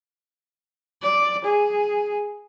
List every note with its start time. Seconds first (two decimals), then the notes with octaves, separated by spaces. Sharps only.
1.02 D5
1.45 G#4